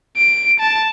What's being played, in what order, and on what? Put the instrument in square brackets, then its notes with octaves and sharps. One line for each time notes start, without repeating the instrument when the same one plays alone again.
[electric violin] D7
A5